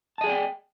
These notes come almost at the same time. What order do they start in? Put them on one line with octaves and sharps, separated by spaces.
A5 D#5 G#4 D5 G5